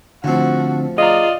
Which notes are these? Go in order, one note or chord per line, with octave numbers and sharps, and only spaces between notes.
A2 D3 F3 C4 F#4
F4 G#4 D5 D#5 A#5